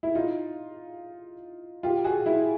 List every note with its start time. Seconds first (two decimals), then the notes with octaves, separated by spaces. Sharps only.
0.03 E4
0.15 D#4 F4
1.83 F4 G4
2.04 F#4 G#4
2.26 E4 F#4